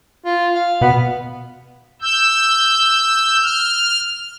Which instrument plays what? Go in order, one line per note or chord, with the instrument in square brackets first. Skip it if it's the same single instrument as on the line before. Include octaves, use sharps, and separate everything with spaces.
[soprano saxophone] F4
F5
[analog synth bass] B2 [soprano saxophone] B3
[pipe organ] E6 G6
F6